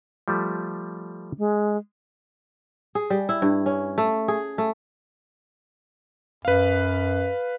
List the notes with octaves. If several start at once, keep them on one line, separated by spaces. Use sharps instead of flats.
F3 G3 A3
G#3
G#4
G3
E4
G2
C#4
A3
G#4
A3
F#2 B4 F5